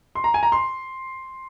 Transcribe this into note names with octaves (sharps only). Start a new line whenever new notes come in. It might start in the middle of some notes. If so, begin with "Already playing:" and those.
C6
A#5
G#5
A#5
C6